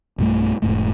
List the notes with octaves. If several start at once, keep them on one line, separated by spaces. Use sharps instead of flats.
B1 G2 D#3 A3
E1 D#2 G#2 A3